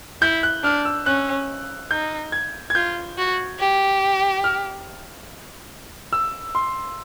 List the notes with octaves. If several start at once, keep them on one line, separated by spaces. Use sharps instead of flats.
E4 G6
F#6
D4 F6
E6
C#4 F#6
D#4 G6
G#6
G#6
F4 G6
F#4
G4
F6
E6
C6